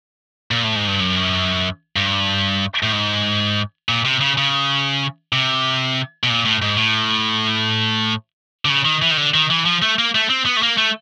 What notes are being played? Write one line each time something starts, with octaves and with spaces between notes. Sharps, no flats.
A#2
A2
G#2
G2
F#2
G2
A2
G#2
A#2
C3
C#3
C#3
C3
B2
A#2
A2
G#2
A2
D3
C#3
D#3
E3
D#3
D3
D#3
E3
F3
A3
A#3
A3
C4
B3
A3
A#3
A3